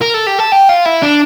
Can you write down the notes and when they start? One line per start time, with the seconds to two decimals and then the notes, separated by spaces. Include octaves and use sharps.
0.01 A#4
0.14 A4
0.27 G4
0.39 A4
0.52 G4
0.69 F4
0.85 E4
1.02 D4